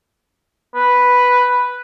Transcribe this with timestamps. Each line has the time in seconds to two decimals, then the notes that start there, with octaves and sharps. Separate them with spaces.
0.75 B4